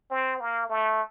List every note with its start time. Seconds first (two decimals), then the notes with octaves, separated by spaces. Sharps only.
0.11 C4
0.40 A#3
0.69 A3